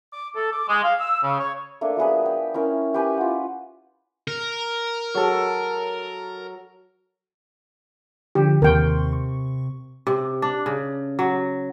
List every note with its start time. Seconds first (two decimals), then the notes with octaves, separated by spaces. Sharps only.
0.13 D6
0.36 A4
0.52 D6
0.68 G#3
0.83 F5
0.99 E6
1.23 C#3
1.38 C#5
1.81 A3 A#3 D4
1.97 F#3 B3 G#4 B4
2.26 G5
2.54 C#4 E4 A#4
2.94 G4 B4 G#5
3.17 F4 F#5
4.28 A#4
5.14 F#3 F#4 G#4 A4 C#5
8.35 D3 F3 G4
8.62 D#2 C3 A#4 G5 C6 C#6
9.13 C#6
10.07 C3
10.42 D4
10.66 C#3
11.19 F#3